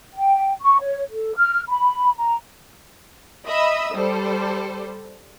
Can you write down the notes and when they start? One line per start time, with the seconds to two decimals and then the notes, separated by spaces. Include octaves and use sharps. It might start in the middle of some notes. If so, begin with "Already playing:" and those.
0.13 G5
0.62 C#6
0.80 C#5
1.10 A4
1.37 F6
1.67 B5
2.15 A#5
3.46 D#5 E5 B5 D#6 E6
3.95 G3 A4 C5